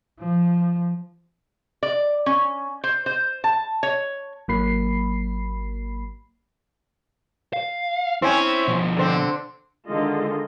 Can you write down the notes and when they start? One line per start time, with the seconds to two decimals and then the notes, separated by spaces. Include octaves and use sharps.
0.20 F3
1.83 D5
2.26 C#4
2.84 C5
3.06 C5
3.44 A5
3.83 C#5
4.48 G#1 F#3 A#3 B5 C7
7.53 F5
8.22 C4 C#4 E4
8.68 B2 F3
8.97 D3 C4
9.87 D3 D#3 G#3 F4 A4 D#5